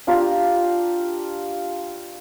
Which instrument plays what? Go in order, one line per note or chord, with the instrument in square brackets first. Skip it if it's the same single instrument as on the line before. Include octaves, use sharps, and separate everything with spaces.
[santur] D4 F4 G4 A#5